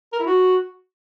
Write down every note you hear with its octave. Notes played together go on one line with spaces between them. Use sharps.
A#4
E4
F#4